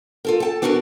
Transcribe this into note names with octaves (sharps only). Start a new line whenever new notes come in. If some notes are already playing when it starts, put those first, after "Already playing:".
F4 A4 A#4
A4 G5 A5
B3 D4 E4 F#4 G#4 A#4